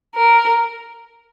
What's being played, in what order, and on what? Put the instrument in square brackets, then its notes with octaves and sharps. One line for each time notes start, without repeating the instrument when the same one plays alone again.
[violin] A#4